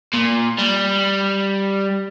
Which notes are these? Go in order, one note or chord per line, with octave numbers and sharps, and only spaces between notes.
A#2
G3